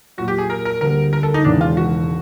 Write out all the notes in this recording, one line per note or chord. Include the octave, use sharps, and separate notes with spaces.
A#2 F#3 A#3 F#4
G4
G#4
A#4
A#4
D2 D3 G3 A#3 A#4
A#4
A4
D#4
E1 D#2 C#3 E3 G#3 D4
F4
F#4